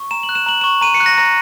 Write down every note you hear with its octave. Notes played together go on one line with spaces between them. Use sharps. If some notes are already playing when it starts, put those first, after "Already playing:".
Already playing: C#6
A#5 E7
F#7
F#6
E7
A#5 F#7
C#6 E7
A#5 D#7
C#7
F#6
A#6
A#5 A#6